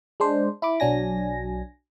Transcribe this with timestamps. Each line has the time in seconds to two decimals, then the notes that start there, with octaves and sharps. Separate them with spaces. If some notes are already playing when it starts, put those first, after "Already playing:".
0.20 G#3 D4 C5
0.62 E4 B5 D6
0.80 B1 F#3 D4 G#5 A#6